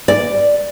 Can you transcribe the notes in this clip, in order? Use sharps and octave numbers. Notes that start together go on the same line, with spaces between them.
D5